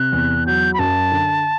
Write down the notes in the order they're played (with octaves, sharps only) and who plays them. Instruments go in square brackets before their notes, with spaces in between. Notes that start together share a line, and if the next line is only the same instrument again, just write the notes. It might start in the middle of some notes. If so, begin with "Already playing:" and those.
Already playing: [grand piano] C3 [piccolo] F#6
[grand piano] E2
[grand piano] F#3 [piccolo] G6
[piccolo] B5
[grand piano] F#2 [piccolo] A5
[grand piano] D3